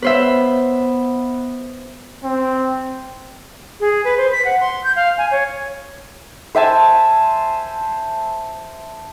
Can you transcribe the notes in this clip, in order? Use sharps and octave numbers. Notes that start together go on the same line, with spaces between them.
B3 B4 C5 E5
C4
G#4
B4
C5
B6
F#5
C6
G6
F5
G#5
C#5
C5 E5 G#5 A5